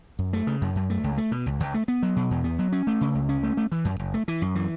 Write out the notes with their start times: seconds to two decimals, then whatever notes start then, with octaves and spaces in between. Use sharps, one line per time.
0.19 F#2
0.33 A3
0.47 C#3
0.61 F#2
0.76 F#2
0.90 A3
1.04 C#2
1.18 A3
1.32 B2
1.46 C#2
1.60 C#2
1.74 A3
1.88 B3
2.03 F#3
2.16 B2
2.31 E2
2.44 B3
2.59 F#3
2.72 C#4
2.87 A3
3.01 C#3
3.15 C#2
3.29 C#4
3.43 A3
3.57 A3
3.72 E3
3.85 F#2
3.99 F#1
4.14 A3
4.28 E3
4.42 F#2
4.55 E3